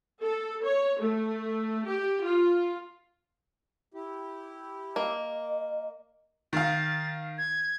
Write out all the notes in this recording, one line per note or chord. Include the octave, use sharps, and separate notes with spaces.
A4
C#5
A3
G4
F4
E4 G4
A#3 D#5
D#3 F5 A6
G#6